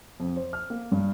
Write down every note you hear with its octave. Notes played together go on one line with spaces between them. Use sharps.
F2
C5
F6
A#3
G2